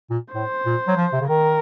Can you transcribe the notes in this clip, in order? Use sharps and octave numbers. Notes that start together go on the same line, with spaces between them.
A#2
A2 C5
A#2
F#3
F3
C3
C#3
D#3 A#4